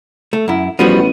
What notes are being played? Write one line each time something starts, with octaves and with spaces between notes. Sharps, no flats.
A3
F#2 E4
A1 F3 G3 B3 F#4 D#7